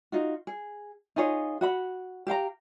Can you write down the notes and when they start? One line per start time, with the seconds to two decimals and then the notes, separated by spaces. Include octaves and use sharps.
0.12 D#4 F4 F#4
0.47 G#4
1.16 D#4 F4 G#4 C#5
1.61 F#4 F#5 B5
2.27 G4 F5 G5 A#5